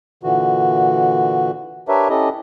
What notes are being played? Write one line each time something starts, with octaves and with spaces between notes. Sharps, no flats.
A#2 D3 E3 F#4
D4 G4 A#4 B4 C#5 E5
C#4 E4 G4 A4 D#5